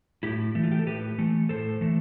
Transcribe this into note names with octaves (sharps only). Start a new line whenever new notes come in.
A2 E4 G4
E3 A3
F4
G4
A4
A2 G4 B4
E3 A3
A2 A4 C5
E3 A3